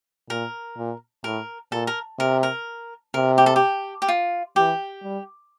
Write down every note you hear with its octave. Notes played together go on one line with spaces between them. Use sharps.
A#2 A#4
A#2
A2 A#4
A#2 A4
A#4
C3 A#4
A#4
C3 A#4
G4
A4
G4
G4
F4
E3 G4
G3